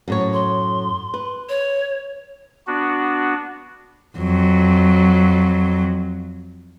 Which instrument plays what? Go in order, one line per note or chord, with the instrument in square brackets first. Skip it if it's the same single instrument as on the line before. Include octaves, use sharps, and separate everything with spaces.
[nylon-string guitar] F#2 A2 C#5
[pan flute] C6
[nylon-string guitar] B4
[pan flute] C#5
[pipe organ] B3 D4 F#4
[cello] F2 F#3